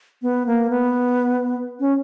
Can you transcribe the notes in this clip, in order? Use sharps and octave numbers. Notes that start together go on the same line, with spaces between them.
B3
A#3
B3
C#4